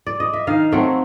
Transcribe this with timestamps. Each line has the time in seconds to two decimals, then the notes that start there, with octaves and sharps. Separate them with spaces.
0.07 D5
0.20 D#5
0.33 E5
0.47 D#3 F5
0.72 F#3 A3 C4 E5